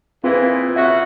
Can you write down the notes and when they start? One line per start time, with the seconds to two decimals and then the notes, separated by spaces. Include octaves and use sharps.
0.24 A#2 E3 C4 F4 G#4 B4
0.76 C#3 F#4 E5